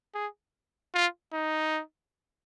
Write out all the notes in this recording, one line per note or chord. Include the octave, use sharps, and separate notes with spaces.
G#4
F4
D#4